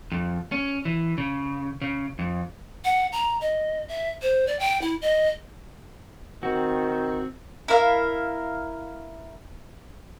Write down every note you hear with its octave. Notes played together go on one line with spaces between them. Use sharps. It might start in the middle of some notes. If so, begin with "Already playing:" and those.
F2
C#4
E3
C#3
C#3
F2
F#5
A#5
D#5
E5
C5
D5
G5
E4
D#5
D#3 C4 F#4
E4 A#4 F5